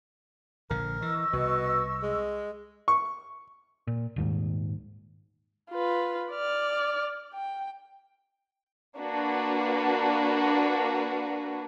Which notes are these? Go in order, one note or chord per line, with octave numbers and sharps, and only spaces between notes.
A#1 D3 A#4
E3 D#5 C#6 E6
C2 B2
G#3
C#6
A#2
D#1 D#2 G#2
F4 B4
D5 F6
G5
A#3 D4 F#4 B4